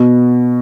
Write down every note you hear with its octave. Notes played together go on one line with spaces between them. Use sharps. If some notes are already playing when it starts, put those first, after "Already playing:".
Already playing: B2